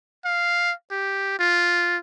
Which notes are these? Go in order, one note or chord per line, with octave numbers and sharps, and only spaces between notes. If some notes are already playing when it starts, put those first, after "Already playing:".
F5
G4
F4